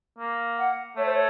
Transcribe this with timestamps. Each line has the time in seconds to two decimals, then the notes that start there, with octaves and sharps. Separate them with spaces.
0.18 A#3
0.58 F#5
0.96 A3 C#5
1.05 C5
1.13 C#5